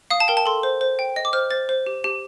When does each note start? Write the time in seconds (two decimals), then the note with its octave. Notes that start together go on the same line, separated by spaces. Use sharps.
0.10 F5 D#6
0.20 A5
0.28 A#4 G5
0.37 A5
0.46 A4 C6
0.63 C5
0.81 C5
0.99 G5
1.16 D#5
1.25 D6
1.33 C5 F6
1.50 C5 A6
1.69 C5
1.86 G4
2.04 G4